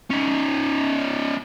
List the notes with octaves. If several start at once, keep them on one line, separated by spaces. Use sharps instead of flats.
C#4 D#4